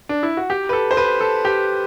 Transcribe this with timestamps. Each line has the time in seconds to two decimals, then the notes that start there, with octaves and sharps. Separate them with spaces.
0.09 D4
0.23 E4
0.37 F#4
0.50 G4
0.69 B4
0.73 A4
0.91 C5
0.97 B4
1.21 A4
1.45 G4